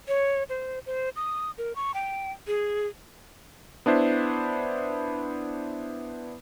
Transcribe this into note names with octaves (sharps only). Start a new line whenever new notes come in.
C#5
C5
C5
D#6
A#4
C#6
G5
G#4
B3 D4 E4 C5